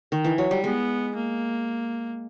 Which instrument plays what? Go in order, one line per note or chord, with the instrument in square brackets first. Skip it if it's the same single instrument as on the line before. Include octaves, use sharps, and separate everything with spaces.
[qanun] D#3
E3
F#3
G3
[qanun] G#3 [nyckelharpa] B3
[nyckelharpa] A#3